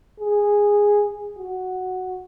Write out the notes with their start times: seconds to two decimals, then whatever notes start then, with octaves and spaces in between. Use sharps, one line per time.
0.20 G#4
1.37 F#4